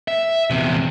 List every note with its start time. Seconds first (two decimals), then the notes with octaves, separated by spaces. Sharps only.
0.08 E5
0.50 E2 C3